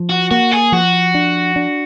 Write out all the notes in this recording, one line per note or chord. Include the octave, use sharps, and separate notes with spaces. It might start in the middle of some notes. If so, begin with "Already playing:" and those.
Already playing: F3
F#4
A#3 F#4
G#4
F3 F#4
D4
D4